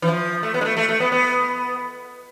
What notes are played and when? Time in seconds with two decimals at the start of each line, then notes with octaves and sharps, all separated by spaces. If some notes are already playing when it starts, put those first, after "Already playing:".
0.02 E3
0.08 F3
0.43 A3
0.54 B3
0.61 G#3
0.65 A3
0.77 A3
0.89 A3
1.00 B3
1.12 B3